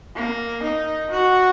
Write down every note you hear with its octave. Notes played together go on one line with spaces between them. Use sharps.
A#3
D#4
F#4